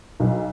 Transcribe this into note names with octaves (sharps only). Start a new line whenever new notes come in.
B1